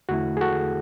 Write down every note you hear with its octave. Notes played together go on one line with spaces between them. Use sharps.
E2 D3 A3 E4 F#4
G#4
F#4 A4